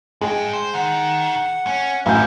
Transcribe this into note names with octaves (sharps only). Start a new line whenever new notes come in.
G2 G#3 G5
C5
D#3 F#5
C#4
A1 F#2 A#2 D3 F5 G#5 G6